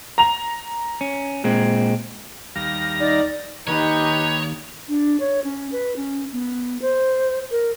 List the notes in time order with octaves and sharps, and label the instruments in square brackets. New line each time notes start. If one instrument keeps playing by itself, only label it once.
[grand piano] A#5 F7
[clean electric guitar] C#4
A#2 G#3 C4
[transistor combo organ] D#2 G3 F5 [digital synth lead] A#6
[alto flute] D#4 [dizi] D5
[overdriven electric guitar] D#2 D#3 [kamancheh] D#4 G4 [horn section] B4 D#5 [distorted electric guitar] C#5
[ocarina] D4
C#5
C#4
B4
C#4
B3
C5
A#4